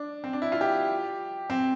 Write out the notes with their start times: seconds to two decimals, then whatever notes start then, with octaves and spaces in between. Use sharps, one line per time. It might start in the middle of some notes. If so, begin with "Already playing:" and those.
Already playing: D4
0.24 C4
0.33 D4
0.42 E4
0.52 F4
0.61 G4
1.50 C4